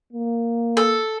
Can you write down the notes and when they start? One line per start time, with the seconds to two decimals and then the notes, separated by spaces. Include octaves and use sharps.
0.13 A#3
0.77 A4